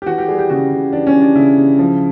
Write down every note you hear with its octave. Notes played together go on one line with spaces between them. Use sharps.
G4
E3 F#4
G4
G3 G#4
G4
C#3 F#4
C#3
E3 D4
C#4
G3
D4
C#3 E4
C#3
F3